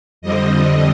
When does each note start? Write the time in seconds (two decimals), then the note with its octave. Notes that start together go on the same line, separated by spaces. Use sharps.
0.22 F2 D3 G3 C4 D#5
0.50 D#5